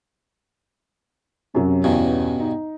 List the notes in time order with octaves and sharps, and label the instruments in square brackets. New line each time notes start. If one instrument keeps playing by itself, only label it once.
[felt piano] F#2 C3 F#3 [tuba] C#4
[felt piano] E2 [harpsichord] G2 B2
[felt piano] D#4